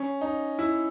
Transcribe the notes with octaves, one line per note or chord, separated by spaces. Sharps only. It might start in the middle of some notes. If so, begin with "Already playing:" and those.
Already playing: C#4
D#4
E4